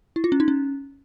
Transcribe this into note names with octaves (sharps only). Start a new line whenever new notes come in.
E4
F4
C#4
D#4
C#4